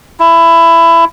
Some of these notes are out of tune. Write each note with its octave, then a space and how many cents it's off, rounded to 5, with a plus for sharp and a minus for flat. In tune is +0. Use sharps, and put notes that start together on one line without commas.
E4 +15